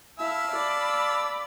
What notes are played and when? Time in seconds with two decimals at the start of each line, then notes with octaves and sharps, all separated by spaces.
0.19 E4 E5 F5 A5 E6
0.52 D5 B5